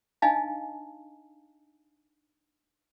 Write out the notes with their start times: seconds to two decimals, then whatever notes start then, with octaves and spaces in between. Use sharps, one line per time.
0.22 D4 D#4 D#5 F5 G#5 A5